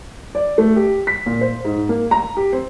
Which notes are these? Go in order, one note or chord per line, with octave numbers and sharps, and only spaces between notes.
D5
A3
G4
B6
A#2
C5
G#2
A#3
A#5
G4
C4